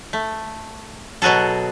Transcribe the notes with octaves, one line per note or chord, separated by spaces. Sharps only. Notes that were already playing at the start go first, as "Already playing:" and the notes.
A3
B2 F#3 F#4 G#4 A4